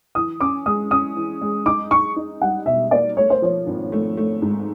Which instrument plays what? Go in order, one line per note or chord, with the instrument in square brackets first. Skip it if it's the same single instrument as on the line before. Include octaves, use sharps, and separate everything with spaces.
[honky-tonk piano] E3 [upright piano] D#6
[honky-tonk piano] C#4 [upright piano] D6
[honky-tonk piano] G#3 [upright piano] D#6
[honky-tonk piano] C#4 [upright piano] D#6
[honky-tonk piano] E3
G#3
[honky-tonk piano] D#4 [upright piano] D6
[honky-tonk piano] D#4 [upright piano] C#6
[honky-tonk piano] D#4
[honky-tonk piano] G3 [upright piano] F#5
[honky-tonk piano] B2 [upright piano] E5
[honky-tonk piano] A#3 [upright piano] D5
[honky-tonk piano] A3 [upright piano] C#5
[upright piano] C5
[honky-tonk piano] F3 [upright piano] C#5
[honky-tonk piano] G#1
A3
A3
G#2